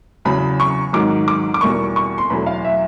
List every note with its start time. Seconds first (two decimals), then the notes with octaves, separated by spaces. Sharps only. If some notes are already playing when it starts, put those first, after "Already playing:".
0.25 E2 C#3 F#3 B5
0.60 C#6
0.93 G#2 D#3 F#3 D6
1.28 D6
1.54 D6
1.61 E2 B2 G3 A#3 C#6
1.96 C#6
2.18 C6
2.30 E2 B2 F#3 A3 B5
2.46 F5
2.64 E5